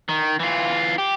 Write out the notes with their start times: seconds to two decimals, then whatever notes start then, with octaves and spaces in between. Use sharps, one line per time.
0.09 D#3
0.40 E3 F4
0.98 G4